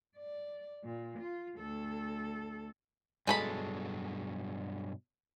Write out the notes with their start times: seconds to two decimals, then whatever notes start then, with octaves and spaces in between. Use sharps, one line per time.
0.17 D5
0.84 A#2
1.20 F4
1.57 D2 A4
3.27 G2 B2 F#3 G#3 A4 B5